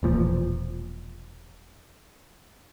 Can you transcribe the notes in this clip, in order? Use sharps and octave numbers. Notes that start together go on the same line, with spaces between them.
E1 A#2 F3